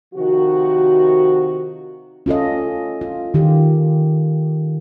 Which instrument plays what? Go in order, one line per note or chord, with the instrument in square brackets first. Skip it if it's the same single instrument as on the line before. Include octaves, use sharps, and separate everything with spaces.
[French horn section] C3 D#3 F3 F#4
[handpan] C#4 F4 A4 D#5
F4
D#3 F4 G4